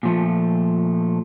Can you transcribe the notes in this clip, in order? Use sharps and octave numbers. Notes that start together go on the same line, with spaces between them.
A#2 F3 A3